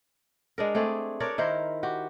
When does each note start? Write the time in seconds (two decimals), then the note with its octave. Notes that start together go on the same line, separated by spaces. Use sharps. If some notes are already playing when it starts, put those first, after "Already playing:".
0.58 G#3 D4 A#4
0.75 A3 C4 G#4 D5
1.20 D4 A#4 C#5 D5
1.38 D#3 E4 A#4 C5
1.83 F#4 G4